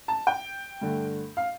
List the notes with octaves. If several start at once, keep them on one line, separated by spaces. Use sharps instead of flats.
A5
G5
G2 D3 A3
F5